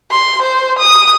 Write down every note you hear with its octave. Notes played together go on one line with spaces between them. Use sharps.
C6
C5
D#6